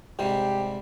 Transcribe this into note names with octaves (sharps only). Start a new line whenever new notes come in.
G#2 C3 G3 G4